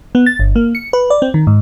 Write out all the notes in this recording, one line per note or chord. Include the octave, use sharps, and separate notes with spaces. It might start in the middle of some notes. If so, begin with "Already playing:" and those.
B3
A6
G1
A#3
C#7
B4
D5
C4
D#3
G#2